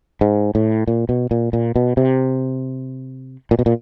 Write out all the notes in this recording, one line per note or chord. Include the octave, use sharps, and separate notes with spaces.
G#2
A2
A#2
B2
A#2
A#2
B2
C3
A#2
B2
A#2